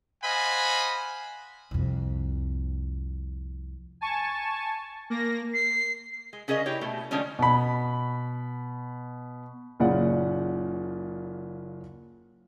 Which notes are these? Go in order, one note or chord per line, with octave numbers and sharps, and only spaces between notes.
C5 D#5 F5 F#5 G#5 B5
C2 F2
G#5 A5 C#6
A#3 A#6
C7
G#3
C#3 C#4 G#4 A#4 D#5
E4 G4 C#5
B2 A3
D3 F3 G#3 A3 C#4
B2 B5
F#1 A#2 C#3 D5 F#5